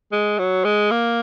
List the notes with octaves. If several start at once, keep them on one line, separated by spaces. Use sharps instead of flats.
G#3
F#3
G#3
A#3